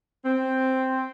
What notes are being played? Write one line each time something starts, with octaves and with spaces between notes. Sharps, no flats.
C4